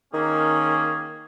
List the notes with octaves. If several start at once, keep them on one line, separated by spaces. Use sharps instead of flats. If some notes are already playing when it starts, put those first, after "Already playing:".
D#3 A#3 C#4 G#4